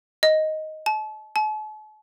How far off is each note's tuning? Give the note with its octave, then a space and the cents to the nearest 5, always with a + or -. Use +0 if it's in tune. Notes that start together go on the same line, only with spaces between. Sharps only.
D#5 +5
A5 -35
A5 -45